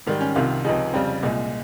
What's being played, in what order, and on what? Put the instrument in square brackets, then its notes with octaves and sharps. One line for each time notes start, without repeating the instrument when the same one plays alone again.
[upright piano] G#2 D#3 G3
C#4
C2 C3 D#3 F4
C#2 C3 F3 G#3 D#4
F2 C#3 G3 C4
C2 A#2 G#3